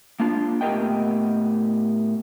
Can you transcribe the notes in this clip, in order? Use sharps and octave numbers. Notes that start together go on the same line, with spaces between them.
A#3 D4 F4
A2 B3 G4 A#4 D#5 G5